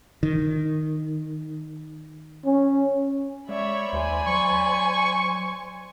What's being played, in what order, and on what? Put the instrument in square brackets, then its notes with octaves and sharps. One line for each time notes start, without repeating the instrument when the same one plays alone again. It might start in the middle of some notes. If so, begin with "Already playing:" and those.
[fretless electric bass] D#3
[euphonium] C#4
[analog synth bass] G#3 [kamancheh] C#5 E5 [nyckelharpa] D5 B5
[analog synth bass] D#2 [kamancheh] C5 G#5
[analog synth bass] F#3 [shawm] C#6